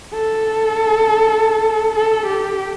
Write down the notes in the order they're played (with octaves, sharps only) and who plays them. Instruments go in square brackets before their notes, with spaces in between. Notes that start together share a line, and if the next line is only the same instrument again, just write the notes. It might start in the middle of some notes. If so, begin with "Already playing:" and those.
[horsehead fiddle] A4
A4
G4